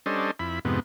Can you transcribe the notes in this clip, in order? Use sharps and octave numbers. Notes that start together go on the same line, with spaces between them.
G3 C#4 D4 A4 C5 D#5
F2 E4 B5
F2 G#2 C3 B3